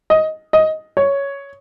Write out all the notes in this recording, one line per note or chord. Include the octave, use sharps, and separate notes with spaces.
D#5
D#5
C#5